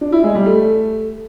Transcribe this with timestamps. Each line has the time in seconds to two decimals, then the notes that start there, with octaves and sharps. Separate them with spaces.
0.01 D4
0.12 E4
0.24 G#3
0.35 G3
0.46 A3